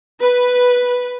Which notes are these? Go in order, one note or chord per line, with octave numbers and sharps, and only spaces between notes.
B4